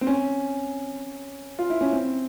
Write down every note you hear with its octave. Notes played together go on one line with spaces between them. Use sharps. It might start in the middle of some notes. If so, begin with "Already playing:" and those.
C4
C#4
F4
E4
C#4
C4